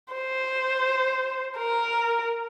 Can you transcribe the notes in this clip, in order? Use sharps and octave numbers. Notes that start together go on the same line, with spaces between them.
C5
A#4